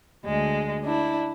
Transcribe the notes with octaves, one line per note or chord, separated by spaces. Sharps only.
D2 G#3
D4 E4